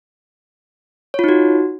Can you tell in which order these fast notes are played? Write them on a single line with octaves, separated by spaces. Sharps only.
C#5 F4 D#4 F#4